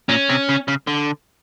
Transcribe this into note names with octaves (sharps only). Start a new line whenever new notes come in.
A#2 C#4
C3
C#3
C#3
D3